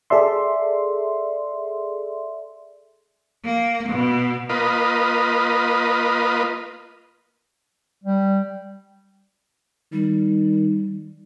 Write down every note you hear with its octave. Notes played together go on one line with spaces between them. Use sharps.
G#4 A4 D5 E5 C6
A#3
B2
A#3 F4 B4 D#5
G3
D#3 G3